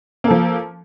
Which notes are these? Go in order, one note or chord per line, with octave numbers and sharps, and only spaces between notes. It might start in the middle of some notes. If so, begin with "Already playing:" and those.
F3 A#3 A4